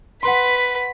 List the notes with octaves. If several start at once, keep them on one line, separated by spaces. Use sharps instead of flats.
B4 F#5 C6 B6